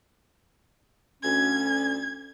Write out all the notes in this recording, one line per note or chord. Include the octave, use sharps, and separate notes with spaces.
D2 C#4 G#6